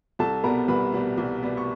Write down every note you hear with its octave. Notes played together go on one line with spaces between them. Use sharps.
C2 A4 A5
B2 G3 B3 A#4 A#5
C2 B4 B5
B2 G3 B3
C2
B2 G3 B3
C#6